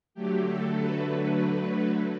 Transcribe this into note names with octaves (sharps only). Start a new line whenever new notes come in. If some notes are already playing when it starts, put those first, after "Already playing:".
D3 F#3 A3 G4
A4
B4